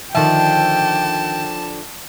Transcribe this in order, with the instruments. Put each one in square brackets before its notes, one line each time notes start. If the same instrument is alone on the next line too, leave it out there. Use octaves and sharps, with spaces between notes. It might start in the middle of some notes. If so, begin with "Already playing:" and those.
[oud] D3 F3 [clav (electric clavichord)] D#3 E5 [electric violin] G5 [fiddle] A5